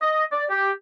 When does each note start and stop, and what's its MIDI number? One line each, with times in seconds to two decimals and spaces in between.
0.01 0.24 75
0.31 0.45 74
0.49 0.71 67